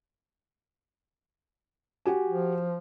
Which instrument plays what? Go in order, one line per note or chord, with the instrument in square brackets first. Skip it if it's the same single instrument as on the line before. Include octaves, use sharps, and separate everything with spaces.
[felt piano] F#4 G4 G#5
[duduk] F3